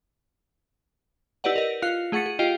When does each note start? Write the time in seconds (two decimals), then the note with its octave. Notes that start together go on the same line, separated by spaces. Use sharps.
1.44 E4 G4 B4 D5 D#5 F#5
1.56 A#4 D#5
1.82 F4 F5 F#6 C#7
2.12 A3 G#4 F#5 C#6 A6 C#7
2.26 G#4
2.39 F4 G4 D#5 F5 G5